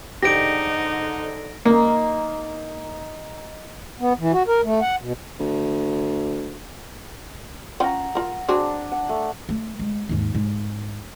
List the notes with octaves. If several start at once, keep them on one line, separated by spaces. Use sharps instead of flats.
G#2 D3 D#4 G4 A#6 D7
A#3 D#4
B3
E3
F#4
A#4
A3
F#5
B2
D2
C#4 F4 F#5 G5 A#5
F4 A#4
C4 D4 F#4 G#4
F#5
A3
A3
G#3
D#2 G#2
G#2